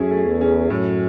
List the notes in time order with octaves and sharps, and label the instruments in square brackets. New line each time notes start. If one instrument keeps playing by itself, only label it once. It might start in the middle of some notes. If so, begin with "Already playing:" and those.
Already playing: [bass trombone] F#2 [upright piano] A3 C#4 E4 G#4
[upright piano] A3
[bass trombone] E2
[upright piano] C#4
[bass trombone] F#2 [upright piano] A2